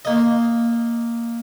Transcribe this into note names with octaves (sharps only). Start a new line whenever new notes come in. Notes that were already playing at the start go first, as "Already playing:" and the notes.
A#3 D#5